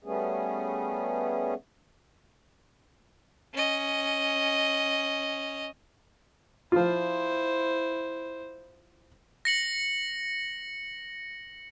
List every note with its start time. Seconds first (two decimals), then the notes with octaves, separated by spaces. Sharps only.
0.04 G3 A3 B3 C#4 G#4
3.53 C#4 D#5
6.72 F3 E4 F4 C5
9.45 A#6 C#7 F#7